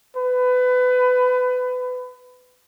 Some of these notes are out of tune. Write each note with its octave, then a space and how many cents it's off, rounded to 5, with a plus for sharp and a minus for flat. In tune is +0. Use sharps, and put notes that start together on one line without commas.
B4 +25